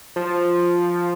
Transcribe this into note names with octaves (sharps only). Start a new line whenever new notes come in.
F3